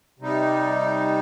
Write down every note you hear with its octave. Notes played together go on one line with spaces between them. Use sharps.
C3 G3 D#4